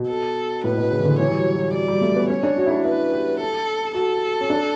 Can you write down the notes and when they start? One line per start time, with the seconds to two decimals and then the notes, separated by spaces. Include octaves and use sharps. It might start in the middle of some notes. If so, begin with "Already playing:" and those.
Already playing: B2
0.09 A4
0.64 A2 B4
0.78 B2
0.91 C#3
0.99 E3
1.05 D3
1.19 E3 C#5
1.28 G3
1.38 F#3
1.56 F#3
1.68 G3
1.74 F#3 D5
1.88 G3
2.01 A3
2.16 B3
2.29 C#4 C#5
2.43 D4
2.57 F#4
2.66 E4
2.71 D4
2.84 E4 B4
3.12 G4
3.40 A4
3.94 F#4 A4
4.41 C#4
4.50 D4